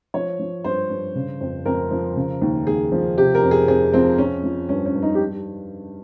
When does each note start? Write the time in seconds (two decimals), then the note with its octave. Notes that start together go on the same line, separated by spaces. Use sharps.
0.14 F3 C#5
0.39 F3
0.64 G2 C5
0.90 G2
1.15 C#3
1.41 F2
1.66 F2 A#4
1.91 F3
2.16 C#3
2.41 D#2
2.67 D#2 G#4
2.92 F3
3.17 C3 G4
3.35 A#4
3.43 F2
3.51 G#4
3.68 F2 G#4
3.93 F3 C4
4.18 F3 C#4
4.43 F3
4.69 G2 C#4
4.86 C#4
4.94 G2
5.02 D#4
5.15 G4